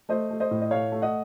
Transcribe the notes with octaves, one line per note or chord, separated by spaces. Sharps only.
A3 C5 D#5
A3
C5 D#5
A2
D#5
A3 C#5 F5
A3
D#5 F#5